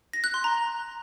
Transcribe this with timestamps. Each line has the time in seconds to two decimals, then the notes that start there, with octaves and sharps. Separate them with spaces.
0.13 A#6
0.24 F#6
0.34 C6
0.44 A#5